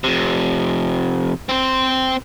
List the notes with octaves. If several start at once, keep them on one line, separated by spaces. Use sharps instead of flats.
F2 C3
C4 C5